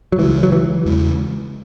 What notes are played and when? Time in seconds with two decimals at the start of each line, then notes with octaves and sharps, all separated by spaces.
0.12 F#3
0.19 C#2 C#3 E3 G#3
0.43 F#3
0.52 E3
0.85 E2 C#3 G#3